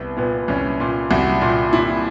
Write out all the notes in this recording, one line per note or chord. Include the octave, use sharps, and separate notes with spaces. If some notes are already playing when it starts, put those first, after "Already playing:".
Already playing: C2 B3
A#2 B3
C2 C#4
A#2
C2 F#4
A#2
A#2 E4